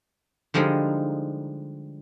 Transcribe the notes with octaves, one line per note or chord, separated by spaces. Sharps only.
D3 F3 G3 G#3 D#4